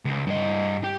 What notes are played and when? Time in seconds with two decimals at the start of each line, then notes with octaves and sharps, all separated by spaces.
0.05 C#2
0.27 G2 D#5
0.84 G4